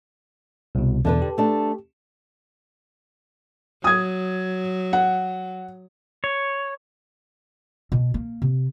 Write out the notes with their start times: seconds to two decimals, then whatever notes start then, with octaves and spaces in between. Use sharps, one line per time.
0.75 C2 B2
1.05 E2 B2 D3 D4 B4
1.22 G4
1.38 A3 D4
3.84 F#3 D#6 G#6
4.93 F#5
6.24 C#5
7.92 B2
8.14 A#3
8.42 C3